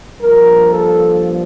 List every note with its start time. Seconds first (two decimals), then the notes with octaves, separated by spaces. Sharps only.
0.20 G2 F3 A#3 A#4
0.70 A4